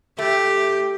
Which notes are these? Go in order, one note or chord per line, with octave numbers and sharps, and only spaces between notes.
A3 G4